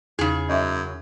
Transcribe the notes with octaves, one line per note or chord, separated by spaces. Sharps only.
E2 C#3 D#4 G#4
F#2 D#5 E5